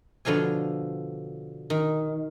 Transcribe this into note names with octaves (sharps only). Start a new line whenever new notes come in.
B2 D3 F3 F5 G#5
D#3